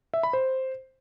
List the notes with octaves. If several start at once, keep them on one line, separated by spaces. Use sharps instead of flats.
E5
B5
C5